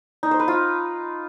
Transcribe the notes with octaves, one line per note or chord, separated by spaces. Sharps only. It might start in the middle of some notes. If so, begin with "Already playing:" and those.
D#4
C5
B4
F4